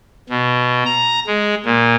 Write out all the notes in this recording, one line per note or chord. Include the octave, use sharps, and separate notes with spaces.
B2
A#5
G#3
A#2